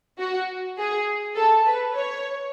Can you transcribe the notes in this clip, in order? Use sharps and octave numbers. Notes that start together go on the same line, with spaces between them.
F#4
G#4
A4
B4
C#5